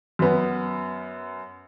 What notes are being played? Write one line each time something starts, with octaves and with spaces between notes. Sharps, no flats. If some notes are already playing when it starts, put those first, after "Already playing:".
F#2 B3